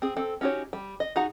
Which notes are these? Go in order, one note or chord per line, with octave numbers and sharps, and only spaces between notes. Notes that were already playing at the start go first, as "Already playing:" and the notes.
C4 G#4
C4 A4
C#4 D#4 F#4 G4 C#5
G3
D#5
D#4 F#4 G#4 F#5 A#5